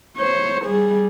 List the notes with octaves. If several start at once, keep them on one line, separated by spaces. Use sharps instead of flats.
C5 C#5
G3 G#4